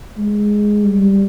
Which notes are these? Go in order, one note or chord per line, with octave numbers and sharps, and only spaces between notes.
G#3
G3